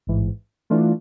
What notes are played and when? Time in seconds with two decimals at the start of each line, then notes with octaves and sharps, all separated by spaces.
0.07 A1 G#2 E3
0.70 E3 A3 D4 F4